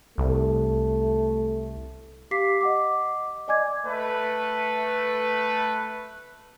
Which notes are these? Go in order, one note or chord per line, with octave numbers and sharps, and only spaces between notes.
C2 A3
G4 F5 D6 B6 C7
D#5 F#5 D6
D5 D#5 G#5 D6 G#6
A3 B4